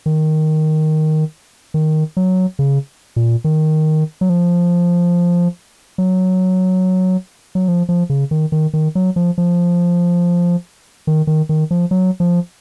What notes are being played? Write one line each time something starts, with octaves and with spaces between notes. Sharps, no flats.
D#3
D#3
F#3
C#3
A#2
D#3
F#3
F3
F#3
F#3
F3
F3
C#3
D#3
D#3
D#3
F#3
F3
F3
D#3
D#3
D#3
F3
F#3
F3